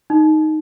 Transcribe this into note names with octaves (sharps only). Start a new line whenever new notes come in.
D#4